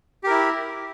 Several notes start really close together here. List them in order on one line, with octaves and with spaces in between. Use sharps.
G4 A#4 E4